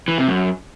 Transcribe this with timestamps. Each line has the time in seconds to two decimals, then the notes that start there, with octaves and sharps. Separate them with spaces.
0.08 E3
0.18 C3
0.28 F#2